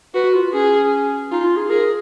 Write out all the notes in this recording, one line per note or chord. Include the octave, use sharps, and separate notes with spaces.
F#4 B4
F4
C#4 G#4
D#4 F4
F4
G#4
G#4 A#4